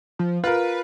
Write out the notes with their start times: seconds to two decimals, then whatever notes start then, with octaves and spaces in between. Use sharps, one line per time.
0.19 F3
0.44 F4 A#4 B4